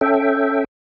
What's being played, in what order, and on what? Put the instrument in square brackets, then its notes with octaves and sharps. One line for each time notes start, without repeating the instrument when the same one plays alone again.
[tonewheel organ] C#4 A4 E5 G5